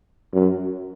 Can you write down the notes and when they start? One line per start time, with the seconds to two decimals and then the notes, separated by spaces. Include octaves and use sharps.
0.33 F#2